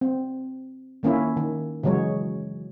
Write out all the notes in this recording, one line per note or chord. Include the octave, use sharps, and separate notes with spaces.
C4
D#3 A#3 C#4 E4
D#3
C#3 E3 F#3 G#3 C#5